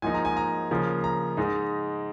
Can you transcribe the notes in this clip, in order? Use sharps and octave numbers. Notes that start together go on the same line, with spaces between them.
G#2 F3 A#3 D#4 G#5
A#5
G#5
A#5
C#3 F3 A#3
A#5
G#2 G#3 D#4